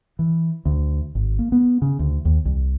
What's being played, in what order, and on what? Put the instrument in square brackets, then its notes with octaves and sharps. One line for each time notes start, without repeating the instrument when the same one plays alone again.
[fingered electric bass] E3
D2
G#1
A#3
B3
C#3
D2
D#2
C2